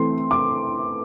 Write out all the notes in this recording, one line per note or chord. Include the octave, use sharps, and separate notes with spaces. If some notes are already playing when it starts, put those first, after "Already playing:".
Already playing: E3 A3 C4 C6
D6